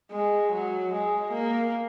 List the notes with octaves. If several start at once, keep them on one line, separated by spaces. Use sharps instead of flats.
G#3
F#3
G#3
A#3